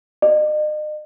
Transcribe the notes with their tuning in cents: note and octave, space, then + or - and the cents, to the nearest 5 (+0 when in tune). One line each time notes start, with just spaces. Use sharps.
D#5 -40